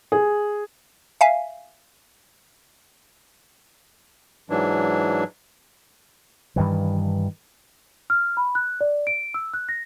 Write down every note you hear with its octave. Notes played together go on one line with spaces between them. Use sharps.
G#4
E5 F5 G#5
G#2 E3 F#3 D4
G2 D#3 E3
F6
B5
F#6
D5
D7
E6
F#6
A#6